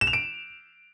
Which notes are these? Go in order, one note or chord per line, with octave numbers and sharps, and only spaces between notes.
E7
F7
D7